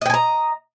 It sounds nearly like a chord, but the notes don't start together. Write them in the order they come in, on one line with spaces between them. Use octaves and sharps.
D#5 G5 G#5 A#5